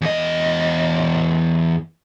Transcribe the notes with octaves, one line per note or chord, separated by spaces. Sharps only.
E2 D#5